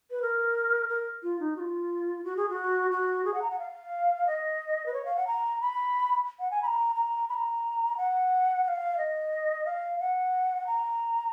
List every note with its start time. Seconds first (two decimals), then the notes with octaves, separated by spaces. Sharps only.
0.11 B4
0.22 A#4
0.89 A#4
1.23 F4
1.40 D#4
1.56 F#4
1.60 F4
2.24 F#4
2.37 G#4
2.49 F#4
2.91 F#4
3.25 G#4
3.34 F#5
3.42 A#5
3.51 F#5
3.59 F5
4.27 D#5
4.86 B4
4.94 C#5
5.05 F5
5.16 F#5
5.27 A#5
5.61 B5
6.39 F#5
6.51 G#5
6.63 B5
6.66 A#5
6.96 A#5
7.29 B5
7.34 A#5
7.97 F#5
8.64 F#5
8.68 F5
8.98 D#5
9.66 F5
10.00 F#5
10.67 A#5